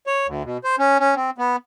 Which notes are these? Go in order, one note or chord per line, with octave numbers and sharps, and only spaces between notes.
C#5
D2
B2
C5
C#4
C#4
C4
B3